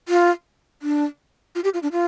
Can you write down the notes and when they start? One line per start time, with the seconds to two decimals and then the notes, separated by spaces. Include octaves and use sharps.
0.09 F4
0.82 D4
1.55 F4
1.64 G4
1.74 F4
1.83 D4
1.92 F4